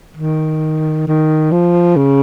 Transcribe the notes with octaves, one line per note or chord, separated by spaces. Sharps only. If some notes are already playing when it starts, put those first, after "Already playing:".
D#3
D#3
F3
C#3